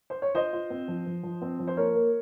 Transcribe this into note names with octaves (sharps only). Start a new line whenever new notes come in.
C5
C#5
F4 C5 D#5
F4
C4
F3
F3
F3
C4
F3
C5
A#3 A#4 C#5
A#3